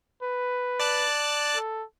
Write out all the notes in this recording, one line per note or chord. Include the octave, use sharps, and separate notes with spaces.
B4
D5 A5 F#6
A4